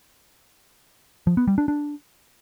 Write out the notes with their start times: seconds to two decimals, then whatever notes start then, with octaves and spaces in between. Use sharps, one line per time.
1.27 F3
1.37 B3
1.48 G3
1.58 D4
1.68 D4